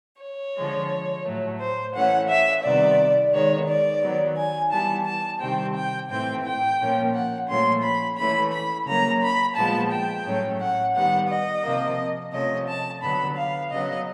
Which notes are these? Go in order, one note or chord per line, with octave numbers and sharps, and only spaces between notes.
C#5
D3 F3 G#3
A2 F#3 A3
C5
E3 A3 C#4 F#5
E5
C3 D#3 G3 B3 D5
D#3 G#3 B3 C#5
D5
D#3 F#3 B3
G#5
E3 G3 B3 A5
A5
C3 D#3 G3 C4 G5
G5
A2 E3 A3 C4 G5
G5
A#2 F3 A#3 C#4
F#5
A#2 F3 A3 C#4 C6
B5
E3 A3 C#4 B5
B5
C#3 F#3 A#3 C#4 A#5
B5
A#2 F3 G#3 B3 A5
G5
A2 F#3 A3 C#4
F#5
D#3 G3 B3 F#5
D#5
C3 F3 A#3
C3 F3 A3 C#4 D#5
A5
D3 F#3 B3 B5
F5
C#3 F#3 B3 D#5